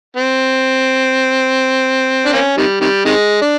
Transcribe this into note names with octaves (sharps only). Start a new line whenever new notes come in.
C4
D4
A#3 C#4
C3 D#3 G3
C3 D#3 G3
C3 D#3 G#3
D4